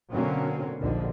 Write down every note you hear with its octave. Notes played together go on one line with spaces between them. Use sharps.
B2 D3 F#3 A#3 C4 C#4
A#1 D#2 D3 F3